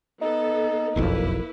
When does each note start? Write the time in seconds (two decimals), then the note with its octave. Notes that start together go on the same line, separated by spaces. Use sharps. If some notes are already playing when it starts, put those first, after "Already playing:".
0.21 B3 D#4 A4
0.96 F#1 B1 F2 A#3 E4 B4